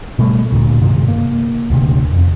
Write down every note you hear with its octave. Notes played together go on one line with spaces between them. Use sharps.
B2 G3 A3
D2 A#2
G2 C3 D#3 G#3
A#3
D#1 D2 C3
F2